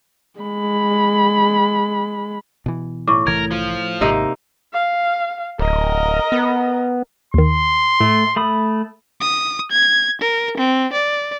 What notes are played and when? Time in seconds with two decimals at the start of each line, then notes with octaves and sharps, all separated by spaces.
0.40 G#3 B5
2.66 B2 E3
3.08 A2 C#6 D6
3.27 C2 E3 A3 A#4 G#6
3.51 F3 F4
4.01 G#1 G#2 C3 A#3 D#4
4.73 F5
5.59 D1 A#4 D#5
6.32 B3
7.34 D#2 D#3 C6
8.00 A2 A3
8.36 A3 B5 D#6
9.21 D#6
9.71 G#6
10.21 A#4
10.58 C4
10.93 D5